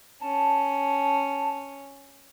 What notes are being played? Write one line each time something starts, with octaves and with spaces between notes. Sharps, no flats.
C#4 A5